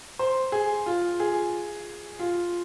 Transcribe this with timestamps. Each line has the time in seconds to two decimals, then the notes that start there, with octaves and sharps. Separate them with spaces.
0.19 C5
0.52 G#4
0.86 F4
1.20 G#4
2.19 F4